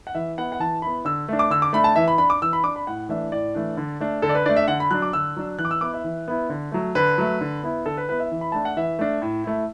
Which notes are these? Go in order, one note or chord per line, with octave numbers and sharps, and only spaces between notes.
F#5
E3 E5
B3 E4 F#5
F#5
E3 A5
B3 E4 B5
D3 E6
A3 D4
D6
D3 E6
D6
A3 D4 B5
A5
E3 E5
B5
D4 B5
D6
E3 E6
B5
D4 D6
B5
A2 F#5
E3 A3 D4 E5
A2 D5
E3 A3 D4
D3
A3 D4
D3 A4
D5
B4
A3 D4 D5
E5
D3 F#5
B5
F#3 D4 F#6
D6
D3 E6
F#3 D4
E3 F#6
D6
E6
B3 E4 D6
E5
E3
B3 E4
D3
F#3 A3
D3 B4
F#3 A3
D3
B3 E4
D3 A4
B4
B3 E4 B4
E5
E3
B5
A3 D4 A5
F#5
E3 E5
A3 D4
A2
A3 E4